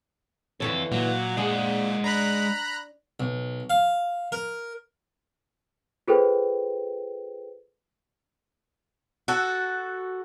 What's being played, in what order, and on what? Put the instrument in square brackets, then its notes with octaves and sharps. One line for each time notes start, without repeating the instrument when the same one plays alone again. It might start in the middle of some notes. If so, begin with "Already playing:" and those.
[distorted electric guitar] F2 A4 [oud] D3 E3 C#5
[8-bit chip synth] A#2 [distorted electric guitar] F#3
[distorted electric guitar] G#3 F#5 [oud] D4 G#4
[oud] D4 [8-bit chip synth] A#5 B5 F#6
[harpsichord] B1
F5
A#4
[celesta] F4 G#4 A4 B4 C5 G5
[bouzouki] F#4 A4